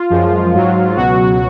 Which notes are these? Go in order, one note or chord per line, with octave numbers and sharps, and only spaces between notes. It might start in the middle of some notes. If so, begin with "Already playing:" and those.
Already playing: F4
F#2 F3 G#3
G#2 F#3
C#2 B2 F#3 F#4